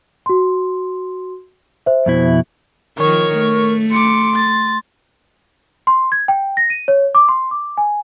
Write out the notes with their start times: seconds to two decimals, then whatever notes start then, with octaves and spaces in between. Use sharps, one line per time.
0.26 F#4 C6
1.86 C5 E5
2.06 F2 B2 E4
2.98 D#3 F3 A#4 C#5 C#6
3.36 A3
3.91 C6 D6 C#7
4.35 A6
5.87 C6
6.12 G#6
6.28 G5
6.57 A#6
6.70 D#7
6.88 C#5
7.15 D6
7.29 C6
7.51 D6
7.78 G#5